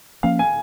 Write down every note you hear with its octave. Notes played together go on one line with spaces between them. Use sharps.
F3 A#3 C#4 F5
G#5